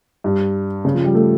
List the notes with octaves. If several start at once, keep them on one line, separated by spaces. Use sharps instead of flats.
G2
C#3
F3
G3
A3